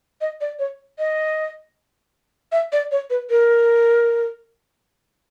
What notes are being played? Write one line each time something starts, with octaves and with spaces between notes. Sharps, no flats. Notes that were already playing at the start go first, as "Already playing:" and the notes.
D#5
D5
C#5
D#5
E5
D5
C#5
B4
A#4